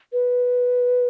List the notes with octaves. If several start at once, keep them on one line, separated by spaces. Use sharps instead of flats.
B4